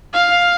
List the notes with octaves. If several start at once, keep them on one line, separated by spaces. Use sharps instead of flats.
F5